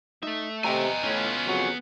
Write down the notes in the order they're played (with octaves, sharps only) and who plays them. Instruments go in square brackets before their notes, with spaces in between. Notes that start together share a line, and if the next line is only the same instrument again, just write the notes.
[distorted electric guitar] A3 E5 [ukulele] D#4
[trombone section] C3 [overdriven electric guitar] B3 G#5 [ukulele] D#5 G5 A#5
[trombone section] A2 [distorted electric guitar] C#4 F4
[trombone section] F2 C#3 F#3